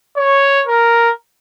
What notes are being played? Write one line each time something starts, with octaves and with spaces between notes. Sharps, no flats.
C#5
A#4